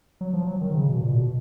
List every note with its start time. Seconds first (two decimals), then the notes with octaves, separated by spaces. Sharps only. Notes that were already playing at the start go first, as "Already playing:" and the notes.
0.21 F#3
0.33 F3
0.47 F#3
0.61 D#3
0.75 C#3
0.89 B2
1.02 A#2
1.17 B2